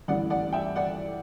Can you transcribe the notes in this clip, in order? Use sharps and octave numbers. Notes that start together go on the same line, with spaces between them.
A1 G2 E3 G3 D5 F#5
D5 F#5
E5 G5
D5 F#5